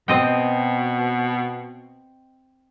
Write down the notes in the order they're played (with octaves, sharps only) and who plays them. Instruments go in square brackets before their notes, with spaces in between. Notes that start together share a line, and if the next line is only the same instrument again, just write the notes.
[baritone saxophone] B2 [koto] C4 D#5 G5